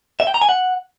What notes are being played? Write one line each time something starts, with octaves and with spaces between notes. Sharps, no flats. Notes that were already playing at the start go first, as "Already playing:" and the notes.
E5
G5
A#5
G#5
F#5